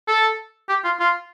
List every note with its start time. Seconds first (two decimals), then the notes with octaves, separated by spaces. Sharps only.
0.08 A4
0.69 G4
0.85 F4
1.00 F4